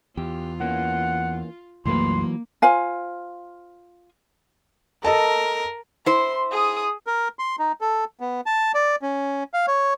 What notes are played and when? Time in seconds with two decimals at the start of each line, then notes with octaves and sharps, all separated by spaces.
0.17 E2 F4 G4
0.60 E3 A#3 C#4 F#5
1.85 C2 F#2 E3 F#3 A3 A#3 B4 C6
2.62 F4 C5 F5 G#5
5.04 A4 A#4 D#5 A5
6.06 E4 C5 C6
6.51 G#4 D#6
7.07 A#4
7.39 C6
7.59 D#4
7.81 A4
8.20 B3
8.46 A5
8.75 D5
9.02 C#4
9.54 F5
9.67 C#5